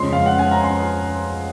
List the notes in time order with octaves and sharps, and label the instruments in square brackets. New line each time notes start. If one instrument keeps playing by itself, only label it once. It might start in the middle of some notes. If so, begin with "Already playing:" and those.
Already playing: [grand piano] F2 C#3 G#3 C6
F5
F#5
G#5
A#5
C6